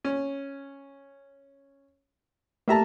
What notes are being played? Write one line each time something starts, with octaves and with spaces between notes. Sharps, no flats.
C#4
A3 A#3 G4 E5 A5 A#5